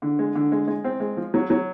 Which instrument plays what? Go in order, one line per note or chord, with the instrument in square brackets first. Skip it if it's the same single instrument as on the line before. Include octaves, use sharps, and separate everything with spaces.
[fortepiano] D3
G#3
D3
G#3
G#3
C4
G#3
F3
F#3
F#3